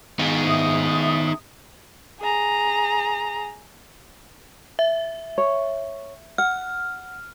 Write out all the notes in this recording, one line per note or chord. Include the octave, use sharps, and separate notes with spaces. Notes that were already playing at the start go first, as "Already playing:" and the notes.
D#3 B3 D#4 G#4 F5
E5 D#6
G#4 A#5
E5
C#5
F#5 F6